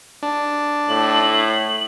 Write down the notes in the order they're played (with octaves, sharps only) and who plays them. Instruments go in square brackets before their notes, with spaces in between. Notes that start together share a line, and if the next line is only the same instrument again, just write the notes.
[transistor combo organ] D4
[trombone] A2 [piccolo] F#7